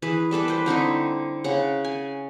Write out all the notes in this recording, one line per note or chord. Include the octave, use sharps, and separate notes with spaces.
E3 G#4 B4
G3 A4 B4 D5
B4 C5
D3 C4 D#4 E4
C#3 F#5
G#5